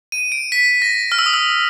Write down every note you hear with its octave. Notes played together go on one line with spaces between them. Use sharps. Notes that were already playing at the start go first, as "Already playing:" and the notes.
D#7
D7
B6
A#6
F6
E6
D#6
E6